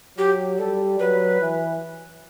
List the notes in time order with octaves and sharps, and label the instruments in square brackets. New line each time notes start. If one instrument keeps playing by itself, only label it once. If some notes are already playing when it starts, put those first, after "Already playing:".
[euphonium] F#3 [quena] G4
[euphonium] G3 [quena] A4
[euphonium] F#3 [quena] B4
[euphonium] E3